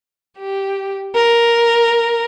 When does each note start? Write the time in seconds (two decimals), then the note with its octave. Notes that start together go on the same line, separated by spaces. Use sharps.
0.38 G4
1.15 A#4